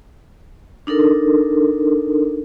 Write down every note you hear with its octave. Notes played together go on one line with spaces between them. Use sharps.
D4 D#4 A4 A#4